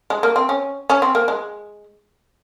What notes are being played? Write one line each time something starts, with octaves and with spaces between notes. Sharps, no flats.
G#3
A#3
C4
C#4
C#4
C4
A#3
G#3